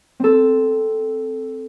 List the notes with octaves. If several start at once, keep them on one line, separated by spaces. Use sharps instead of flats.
C4 A4